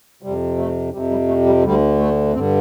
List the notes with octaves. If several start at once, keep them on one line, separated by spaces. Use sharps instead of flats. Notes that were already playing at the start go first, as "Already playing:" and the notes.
F2 C3 G3
A3
F2 C3 G3
G3
A3
G3
D2 D3 G3
A3
G2 D3 C4